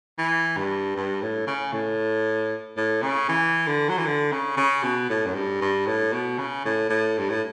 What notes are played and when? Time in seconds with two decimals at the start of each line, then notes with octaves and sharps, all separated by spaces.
0.18 E3
0.57 G2
0.96 G2
1.22 A2
1.47 C#3
1.73 A2
2.77 A2
3.03 C#3
3.29 E3
3.67 D3
3.89 F#3
3.98 E3
4.06 D3
4.32 C#3
4.57 C#3
4.83 B2
5.10 A2
5.26 F#2
5.35 G2
5.61 G2
5.87 A2
6.13 B2
6.38 C#3
6.65 A2
6.90 A2
7.18 G2
7.30 A2